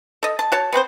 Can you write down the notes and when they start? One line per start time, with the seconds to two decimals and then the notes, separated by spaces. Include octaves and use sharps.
0.23 A4 D#5
0.39 A5
0.52 F#4 C#5 A5
0.72 B3 C4 B4 C5